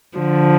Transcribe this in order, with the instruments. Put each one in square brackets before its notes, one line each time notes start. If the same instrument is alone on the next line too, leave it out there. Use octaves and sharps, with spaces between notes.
[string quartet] D3 F3